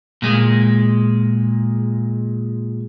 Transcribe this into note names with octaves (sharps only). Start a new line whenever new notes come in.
A#2 G#3